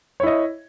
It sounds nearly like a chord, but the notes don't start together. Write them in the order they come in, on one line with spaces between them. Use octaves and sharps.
C#5 E4 D#5